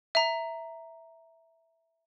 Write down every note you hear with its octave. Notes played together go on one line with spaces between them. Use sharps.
E5 A#5